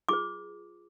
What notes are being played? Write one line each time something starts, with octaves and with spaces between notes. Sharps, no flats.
F4 G#4 B4 D6